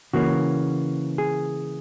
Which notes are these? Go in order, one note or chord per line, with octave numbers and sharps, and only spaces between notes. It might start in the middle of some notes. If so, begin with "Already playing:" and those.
C#3 E3 A#3 C#4 F#4
G#4